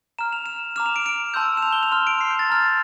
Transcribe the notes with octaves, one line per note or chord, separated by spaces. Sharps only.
A#5 F6 E7
F7
E7
A#5 D6 F6 E7
F7
D7
D7
A5 C6 E6 G6
E7
F7
G7
F7
C6 F6 E7
D7
C7
G6
A6
A#5 F6